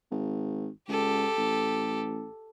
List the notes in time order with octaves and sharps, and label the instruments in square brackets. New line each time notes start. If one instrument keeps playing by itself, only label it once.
[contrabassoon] G#1
[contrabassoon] C#2 [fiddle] G4 A4
[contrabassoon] A1